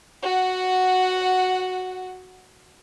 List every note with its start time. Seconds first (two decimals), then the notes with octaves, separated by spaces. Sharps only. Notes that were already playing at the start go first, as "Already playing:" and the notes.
0.22 F#4 F#5